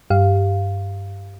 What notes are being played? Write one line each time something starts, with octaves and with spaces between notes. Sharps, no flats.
G2 G4 F5